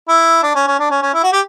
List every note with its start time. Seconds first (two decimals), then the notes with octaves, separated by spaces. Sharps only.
0.08 E4
0.43 D4
0.55 C#4
0.67 C#4
0.79 D4
0.91 C#4
1.02 C#4
1.14 E4
1.24 F#4
1.33 G4